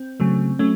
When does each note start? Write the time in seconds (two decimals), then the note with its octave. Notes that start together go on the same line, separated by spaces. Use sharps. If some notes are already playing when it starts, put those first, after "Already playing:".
Already playing: C4
0.20 C#3 F#3 A3
0.59 F#3 A3 C#4